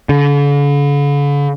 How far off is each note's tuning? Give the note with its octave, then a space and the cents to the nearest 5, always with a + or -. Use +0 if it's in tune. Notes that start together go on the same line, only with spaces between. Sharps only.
D3 -45